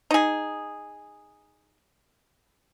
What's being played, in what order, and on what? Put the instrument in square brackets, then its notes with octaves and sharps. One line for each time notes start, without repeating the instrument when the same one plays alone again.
[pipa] D#4 G#4